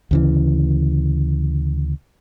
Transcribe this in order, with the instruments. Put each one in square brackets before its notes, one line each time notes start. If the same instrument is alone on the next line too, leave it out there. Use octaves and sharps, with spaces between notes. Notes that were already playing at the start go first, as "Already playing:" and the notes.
[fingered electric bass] D2 C#3 E3